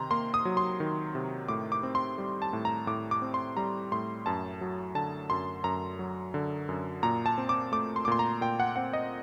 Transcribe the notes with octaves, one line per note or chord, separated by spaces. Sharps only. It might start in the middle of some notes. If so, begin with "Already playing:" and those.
Already playing: C3 D#3 A#5 C6
A#3 C6
D#6
F#3
C6
D#3
C3
A2 D6
D6
C4
C6
G3
A5
A2
A#5
A2 D6
D6
C4
C6
G3 A#5
A2 C6
F#2 A5
F#3
D3 A5
F#2 C6
F#2 A#5
F#3
D3
F#2
A#2 A#5
A5
C4
D6
A3 D6
C6
D6
A#2 C6
A#5
A#2 G5
F#5
C4 F#5
D#5